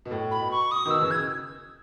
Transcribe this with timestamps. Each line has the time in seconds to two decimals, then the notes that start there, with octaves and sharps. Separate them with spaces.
0.05 B2
0.11 A2
0.31 B5
0.41 B2
0.51 C#6
0.71 D#6
0.86 B2 D#3 E6
1.01 C#3 E3
1.11 G#6